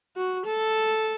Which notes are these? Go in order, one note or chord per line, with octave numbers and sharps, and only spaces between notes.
F#4
A4